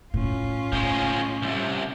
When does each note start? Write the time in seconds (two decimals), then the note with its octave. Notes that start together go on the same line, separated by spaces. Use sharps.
0.14 A2 C#4 F4
0.72 A2 F3 G#3
1.42 C2 C3